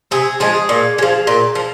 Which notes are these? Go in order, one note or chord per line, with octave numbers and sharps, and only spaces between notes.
C3 G#4
F3 G#3 G#4
A#2
G#3
F3
A#2
F3